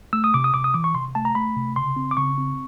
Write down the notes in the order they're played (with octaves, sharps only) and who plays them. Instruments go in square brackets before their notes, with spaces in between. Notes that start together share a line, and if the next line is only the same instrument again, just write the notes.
[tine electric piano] A3 E6
D#6
C3 D6
D#6
C3 D6
D#6
E3 D6
C#6
C3 C6
A3 A5
A#5
A3 B5
C3
C#3 C6
C4
D6
C#3 C#6
C4